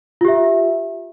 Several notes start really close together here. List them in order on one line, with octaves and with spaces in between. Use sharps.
F4 G4 E5